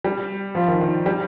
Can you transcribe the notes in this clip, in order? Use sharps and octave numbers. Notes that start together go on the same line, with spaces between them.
G3
F3
D#3
D#3
G3